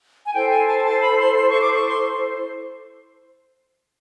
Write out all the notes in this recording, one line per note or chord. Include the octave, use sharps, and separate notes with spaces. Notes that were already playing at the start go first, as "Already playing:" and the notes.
G#5
E4 A4 C5 G5
G#5
A5
G#5
A5
B5
C6
C6
C#6
D6
C#6
C6